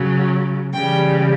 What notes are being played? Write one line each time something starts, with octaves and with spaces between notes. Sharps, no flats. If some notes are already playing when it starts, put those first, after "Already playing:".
Already playing: C#3 F#3
C#3 E3 G3 G5